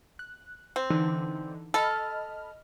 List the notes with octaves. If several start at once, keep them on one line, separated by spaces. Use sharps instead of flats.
F#6
C4
D3 E3 D#4
A4 D#5 B5 F6